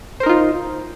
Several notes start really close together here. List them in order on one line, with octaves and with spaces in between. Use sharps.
C5 A#4 D#4 F4